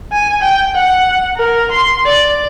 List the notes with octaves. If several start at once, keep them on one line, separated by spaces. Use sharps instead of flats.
G#5
G5
F#5
A#4
C6
D5